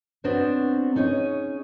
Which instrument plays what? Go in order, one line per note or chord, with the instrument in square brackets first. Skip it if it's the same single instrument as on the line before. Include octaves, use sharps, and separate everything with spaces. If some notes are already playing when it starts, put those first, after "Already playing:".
[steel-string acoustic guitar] B3 C4 D4 F#4 C5 C#5
C#4 D#4 G#4 C#5